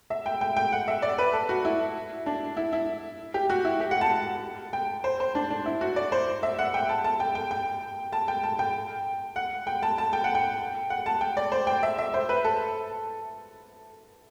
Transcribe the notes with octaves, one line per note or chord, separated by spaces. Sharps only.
E5
G5
G5
G5
F#5
E5
D5
B4
A4
F#4
E4
D4
E4
E4
G4
F#4
E4
G4
F#5
A5
G5
C5
C5
D4
D4
E4
F#4
D5
C5
E5
F#5
G5
A5
A5
G5
G5
G5
A5
G5
A5
G5
F#5
G5
A5
A5
G5
F#5
G5
F#5
A5
G5
D5
C5
G5
E5
E5
C5
B4
A4